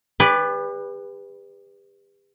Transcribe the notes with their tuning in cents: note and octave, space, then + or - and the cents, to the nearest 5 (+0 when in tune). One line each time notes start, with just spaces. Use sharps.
G4 +40 B4 +0 D5 -25